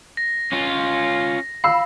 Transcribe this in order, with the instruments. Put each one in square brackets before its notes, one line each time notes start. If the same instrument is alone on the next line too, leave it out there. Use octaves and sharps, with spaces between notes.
[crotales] A#6
[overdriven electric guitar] C#4 F4
[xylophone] F5 [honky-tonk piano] B5 E6